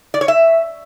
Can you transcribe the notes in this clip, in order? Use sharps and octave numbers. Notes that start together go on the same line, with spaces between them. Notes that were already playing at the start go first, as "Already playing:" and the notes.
D5
C#5
E5